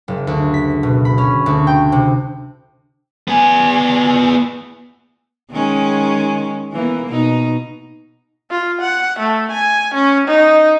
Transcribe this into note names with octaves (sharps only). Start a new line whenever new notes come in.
F#1
D2
B6
B2
B5
C#4
D2
G5
C3
B3 G#5
D#3 G#3 C#4
E3 A#3 B3
B2 D#4
F4
F#5
A3
G#5
C#4
D#4